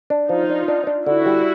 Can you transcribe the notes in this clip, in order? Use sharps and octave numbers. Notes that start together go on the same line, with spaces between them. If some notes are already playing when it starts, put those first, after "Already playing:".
D4
F3 D#4 F4
D4
D4
D4
D3 E4 F#4
G3